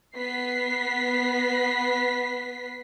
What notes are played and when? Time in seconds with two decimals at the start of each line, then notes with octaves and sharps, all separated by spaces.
0.15 B3 B6 C7